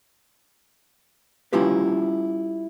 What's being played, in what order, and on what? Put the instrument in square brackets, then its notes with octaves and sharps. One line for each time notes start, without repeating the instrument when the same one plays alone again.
[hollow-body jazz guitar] G3 C#4 E4 F4 G4 B4